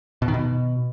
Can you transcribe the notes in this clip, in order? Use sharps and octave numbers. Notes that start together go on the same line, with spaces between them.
B2
D#3
B2